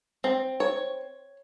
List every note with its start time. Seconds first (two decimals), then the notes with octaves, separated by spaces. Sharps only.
0.24 C4
0.60 C#5